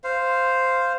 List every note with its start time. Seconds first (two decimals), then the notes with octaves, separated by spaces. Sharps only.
0.04 C5 F5